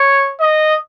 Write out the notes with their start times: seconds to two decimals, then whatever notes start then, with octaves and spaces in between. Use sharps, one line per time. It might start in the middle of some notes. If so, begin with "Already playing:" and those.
Already playing: C#5
0.41 D#5